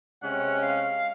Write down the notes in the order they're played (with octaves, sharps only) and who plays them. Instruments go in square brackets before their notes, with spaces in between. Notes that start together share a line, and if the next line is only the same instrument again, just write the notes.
[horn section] C3 G#3 C#4 [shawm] F#5
[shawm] F5